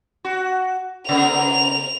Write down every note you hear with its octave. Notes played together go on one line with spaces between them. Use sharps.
F#4
C#3 B3 A#4 F7